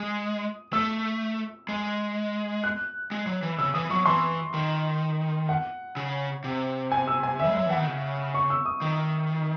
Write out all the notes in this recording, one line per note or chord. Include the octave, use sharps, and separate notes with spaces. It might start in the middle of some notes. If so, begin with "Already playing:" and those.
Already playing: G#3 D#6
A3 E6
G#3
F#6
G#3
F#3
E3
C#3 E6
E3 D#6
F#3 C#6
E3 C6
D#3
F#5
C#3
C3
G#5
E6
G#5
E5
G#3
F#3 E5
E3 F#5
D#3
C#3
C#6
E6
D#6
D#3